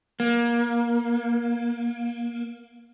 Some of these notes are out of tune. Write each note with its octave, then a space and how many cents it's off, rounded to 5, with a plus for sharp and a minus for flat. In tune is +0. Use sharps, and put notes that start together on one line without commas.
A#3 +25